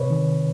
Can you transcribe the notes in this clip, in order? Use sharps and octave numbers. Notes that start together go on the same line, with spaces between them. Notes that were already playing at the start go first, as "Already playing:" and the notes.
Already playing: C3 B4 C#5
D#3